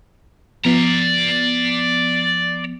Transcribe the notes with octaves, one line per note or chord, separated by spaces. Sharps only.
F3 B3 D5 A#5